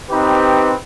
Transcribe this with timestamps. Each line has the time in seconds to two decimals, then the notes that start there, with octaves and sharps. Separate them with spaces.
0.10 C4 D#4 G4 B4